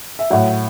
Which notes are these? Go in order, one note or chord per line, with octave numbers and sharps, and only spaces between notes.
E5
A2 F#3 F#5